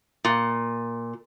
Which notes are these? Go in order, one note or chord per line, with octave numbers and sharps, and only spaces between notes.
A#2